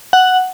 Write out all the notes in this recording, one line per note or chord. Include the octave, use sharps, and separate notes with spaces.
F#5